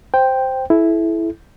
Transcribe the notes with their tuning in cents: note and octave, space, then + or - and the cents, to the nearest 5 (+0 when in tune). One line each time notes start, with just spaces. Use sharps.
C5 +0 G5 +0
E4 +0 A4 -40